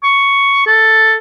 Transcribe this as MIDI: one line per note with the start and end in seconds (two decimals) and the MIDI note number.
0.03 0.63 85
0.66 1.15 69